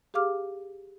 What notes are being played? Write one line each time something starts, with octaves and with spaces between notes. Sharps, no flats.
G4 G#4 F5 D6 F6